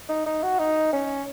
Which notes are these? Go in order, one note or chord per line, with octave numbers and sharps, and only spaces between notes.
D#4
D#4
F#4
D#4
C#4